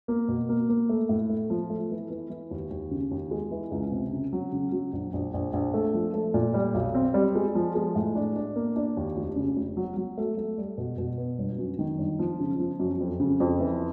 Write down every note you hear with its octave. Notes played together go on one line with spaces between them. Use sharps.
A#3
B2
A#3
A#3
A3
A2
A3
F3
A3
E3
E3
E3
D#2
D#2
C#3
D#2
G#3
E3
C#2
C3
C#3
F#3
C#3
F#3
A#1
A#1
A#1
A#1
A3
F3
A3
A#2
G3
B1
C4
G3
G#3
F3
G#3
A2
D4
D4
A#3
D4
D#2
F1
C#3
F1
F#3
F#3
A3
A3
G3
B2
B2
B3
G1
F#2
D#3
G1
F3
C#3
F3
F#2
F2
C#3
F2
E3